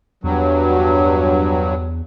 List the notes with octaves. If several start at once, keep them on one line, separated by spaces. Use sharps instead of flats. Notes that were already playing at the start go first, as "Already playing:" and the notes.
E2 G2 F#3